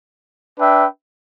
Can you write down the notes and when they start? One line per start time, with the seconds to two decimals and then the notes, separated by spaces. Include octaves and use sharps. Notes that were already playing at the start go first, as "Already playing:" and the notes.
0.59 D4 B4 E5 G5